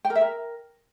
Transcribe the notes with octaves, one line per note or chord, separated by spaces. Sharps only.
G5
A#4
E5
A#4